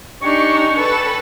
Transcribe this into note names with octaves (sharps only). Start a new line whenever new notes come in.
D4 D#4 G4 G5 G#5 C#6
A4 B4